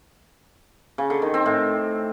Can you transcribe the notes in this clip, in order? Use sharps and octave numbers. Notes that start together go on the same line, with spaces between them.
C#3
D3
D#3
C4
A2